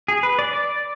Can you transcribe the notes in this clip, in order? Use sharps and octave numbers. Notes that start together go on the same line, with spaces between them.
G#4
B4
D5
D5